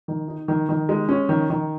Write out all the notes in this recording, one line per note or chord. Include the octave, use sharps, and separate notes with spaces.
D#3
D#4
D#3
D#3
G#3
C#4
D#3
D#3